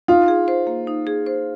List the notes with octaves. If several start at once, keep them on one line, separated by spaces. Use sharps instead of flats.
D#4 F4
G#4
C5
A#3
D#4
G#4
C5